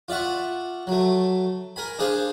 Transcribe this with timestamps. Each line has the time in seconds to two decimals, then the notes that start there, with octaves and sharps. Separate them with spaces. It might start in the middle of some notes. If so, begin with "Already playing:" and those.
0.08 F4 D5 E5 F#5 C#6
0.87 F#3 A3
1.76 A#4 G#5 B5
1.99 D4 G#4 C5 F5 G#5